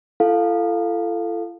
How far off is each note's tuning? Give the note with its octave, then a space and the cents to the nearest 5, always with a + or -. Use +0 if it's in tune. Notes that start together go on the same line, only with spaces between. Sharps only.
F4 -45 A4 +0 F5 +10